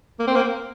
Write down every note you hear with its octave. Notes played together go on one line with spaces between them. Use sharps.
A#3
C4
A#3